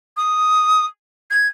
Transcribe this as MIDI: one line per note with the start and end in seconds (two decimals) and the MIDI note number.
0.17 0.85 87
1.30 1.47 92